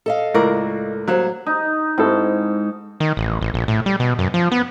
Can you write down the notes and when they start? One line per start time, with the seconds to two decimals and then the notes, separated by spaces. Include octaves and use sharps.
0.06 A4 D#5 F5
0.34 C#2 A2 A#4 D5
1.08 F#3 G3 A#3 C5
1.46 D#4
1.98 G#2 C4 E4 A4
3.00 D#3
3.17 A1
3.41 A1
3.54 A#1
3.68 A2
3.86 G3
4.00 B2
4.19 F#2
4.34 F3
4.52 B3